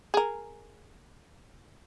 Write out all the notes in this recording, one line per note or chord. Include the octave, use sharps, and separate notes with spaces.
G#4 A#4